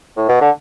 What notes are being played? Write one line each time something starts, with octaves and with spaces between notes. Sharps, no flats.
A2
B2
D3